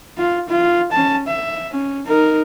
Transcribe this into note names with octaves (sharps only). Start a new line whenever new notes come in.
F4
F4
C#4 A5
E5
C#4
D#4 A#4